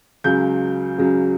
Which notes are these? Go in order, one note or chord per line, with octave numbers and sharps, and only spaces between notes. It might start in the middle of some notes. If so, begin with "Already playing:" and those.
C#2 C#3 F#3 G6
C#2 C#3 F#3